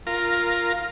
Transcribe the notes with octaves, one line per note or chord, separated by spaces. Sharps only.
F4 A#4